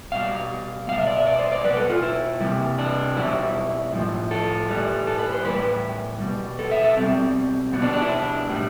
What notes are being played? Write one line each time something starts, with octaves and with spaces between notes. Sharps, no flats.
B2 G3 F5
B2 G3 F5
E5
D5
E5
D5
C5
D5
B2 G3 B4
A4
F4
E4
C3 E3 G3
D4
B2 G3 E4
A2 F3
A4
A2 E3 G3
A4
B4
C5
A2 E3 G3 B4
B2 G3
A4
E5
A4
B2 G3 C4
B2 G3 B3
D4
D4
E4
D4
A2 G3